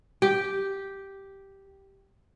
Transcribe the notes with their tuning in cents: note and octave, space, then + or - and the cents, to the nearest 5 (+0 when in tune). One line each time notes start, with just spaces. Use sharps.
G4 -5